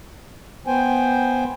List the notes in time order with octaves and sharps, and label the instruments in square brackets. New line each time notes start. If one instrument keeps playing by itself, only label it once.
[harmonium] B3 C5 G5 G#5